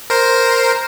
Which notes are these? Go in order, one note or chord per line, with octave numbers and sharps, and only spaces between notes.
A#4 C5